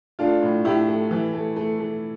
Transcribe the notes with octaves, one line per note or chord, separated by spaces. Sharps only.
A3 D4 F4
A2
A2 E4 G4
A3
E3
A3
A3
A3